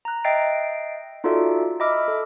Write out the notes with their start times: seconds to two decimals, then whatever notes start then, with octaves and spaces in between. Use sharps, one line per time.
0.05 A#5 F#6
0.24 D#5 E5 G5 A6 C7 D7
1.24 D#4 F4 F#4 A4 D5 E5
1.80 D#5 E5 B5 D6 E6 F6
2.08 A4